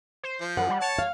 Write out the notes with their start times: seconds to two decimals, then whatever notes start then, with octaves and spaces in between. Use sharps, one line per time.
0.23 C5
0.41 F3
0.57 F#2 F#5
0.70 G3
0.82 C#5 A5
0.99 F5